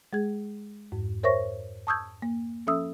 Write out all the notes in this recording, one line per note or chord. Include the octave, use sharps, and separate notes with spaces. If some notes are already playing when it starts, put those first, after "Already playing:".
G#3 G#4 G#6
F2 G#2
A#4 C5 C#5 E5 C#6 A#6
A5 C#6 D#6 E6 G6 G#6
A#3
F3 C#4 A4 E5 D#6 E6